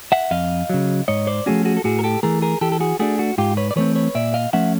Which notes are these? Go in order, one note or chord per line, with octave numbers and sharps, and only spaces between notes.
E5 F#5
F2 D#5 F5
C#3 F#3
G#2 C#5 D#5
C5 D5
F3 A3 C#4 F#4 G#4
F#4 G#4
A4
A2 F#4 G#4
A#4
G4 A4
E3 A3 G#4 A#4
G#4 A#4
E3 G4 A4
A4
F#4 G#4
A3 D4 F#4 G#4
F#4
G#2 F4 G4
B4 C#5
D5
E3 A3 C4 B4 C#5
B4 C#5
A#2 D5 E5
D#5 F5
F3 A3 C#4 E5 F#5